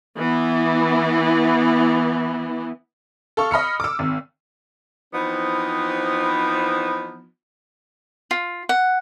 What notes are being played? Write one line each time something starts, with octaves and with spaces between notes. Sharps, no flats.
E3 B3
A4 F5 C#6
D#5 B5 F6 C#7
D6 E6
G#1
E3 F3 B3 C4 D#4
F4
F#5